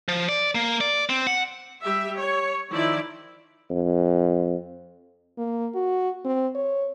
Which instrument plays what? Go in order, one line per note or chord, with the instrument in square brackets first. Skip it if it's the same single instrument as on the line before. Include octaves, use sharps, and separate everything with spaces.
[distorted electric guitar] F3
D5
A#3
D5
C4
F#5
[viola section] G3 G4 E5
C#5
D#3 F3 E4 D5
[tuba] F2
[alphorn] A#3
F#4
C4
C#5